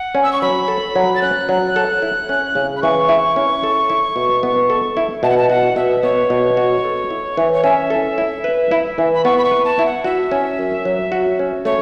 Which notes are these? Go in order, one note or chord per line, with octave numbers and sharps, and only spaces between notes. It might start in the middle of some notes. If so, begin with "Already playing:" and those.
Already playing: F#5
C#4
E6
C#6
F#3 B5
A4
F#3
A6
C#4 F#6
F#3
A4
E4
C#4
C#3
B5
E3 C#6
E4
C#4
A4
E4
B2
B3
A4
E4
B2 A5
F#5
A5
F#4 F#5
B2 E5
B3 C#5
B2
F#4
A4
E4
E3
C#5
C#4 E5
A4
E4
B4
E4
E3
B5
B3 C#6
B5
C#6
B4
A5
E4
F#5
F#4 E5
C#4
F#2
F#3
F#4
C#4
A3 C#5